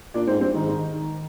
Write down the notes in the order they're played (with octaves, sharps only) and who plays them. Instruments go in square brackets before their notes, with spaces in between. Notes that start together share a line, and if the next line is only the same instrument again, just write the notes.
[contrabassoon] A#2 [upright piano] D4 D5
[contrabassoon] G#2 [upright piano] C4 C5
[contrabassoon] G2 [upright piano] C4 C5
[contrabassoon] G#2 [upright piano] D#3 D#4
[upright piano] D#3 D#4